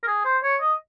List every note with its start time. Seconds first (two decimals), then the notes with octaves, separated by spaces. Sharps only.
0.03 A#4
0.07 G#4
0.25 C5
0.44 C#5
0.61 D#5